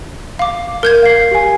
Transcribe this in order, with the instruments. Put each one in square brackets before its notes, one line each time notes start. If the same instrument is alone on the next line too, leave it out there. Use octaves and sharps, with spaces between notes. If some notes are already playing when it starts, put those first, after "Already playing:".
[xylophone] F5 D6
A#4 G6 G#6
[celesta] F5 C7
G4 G#5